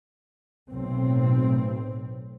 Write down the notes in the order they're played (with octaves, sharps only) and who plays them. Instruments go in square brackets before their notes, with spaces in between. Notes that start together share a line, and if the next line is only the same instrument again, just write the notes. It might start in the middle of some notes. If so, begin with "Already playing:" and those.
[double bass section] B1 A2 C4